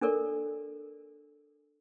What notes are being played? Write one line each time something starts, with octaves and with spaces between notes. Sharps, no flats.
D4 A4 A#4 D5